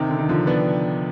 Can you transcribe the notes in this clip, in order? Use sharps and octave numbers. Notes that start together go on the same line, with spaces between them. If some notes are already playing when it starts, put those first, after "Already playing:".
Already playing: C3 D#3
D3
D#3
D3 F3
B3 D4